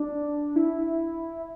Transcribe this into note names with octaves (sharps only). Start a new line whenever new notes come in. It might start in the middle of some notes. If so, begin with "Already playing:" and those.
Already playing: D4
E4